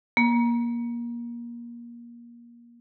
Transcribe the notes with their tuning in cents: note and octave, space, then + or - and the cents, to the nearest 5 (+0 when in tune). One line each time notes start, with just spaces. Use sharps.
A#3 +25